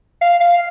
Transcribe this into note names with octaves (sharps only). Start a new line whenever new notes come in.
F5
F5